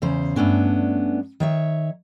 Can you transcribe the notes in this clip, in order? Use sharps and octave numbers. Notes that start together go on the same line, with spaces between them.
E2 C#3 C5
G2 A3 B3 C#4 D4
D#3 C#5 E5